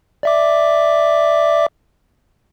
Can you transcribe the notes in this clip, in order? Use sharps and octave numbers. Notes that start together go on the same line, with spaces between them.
D5 E5 D6